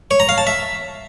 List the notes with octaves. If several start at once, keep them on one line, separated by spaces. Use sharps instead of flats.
C#5
A#5
F5
A5
E5